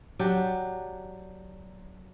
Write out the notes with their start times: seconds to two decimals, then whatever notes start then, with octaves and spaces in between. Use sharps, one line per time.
0.19 F#3 D4 G4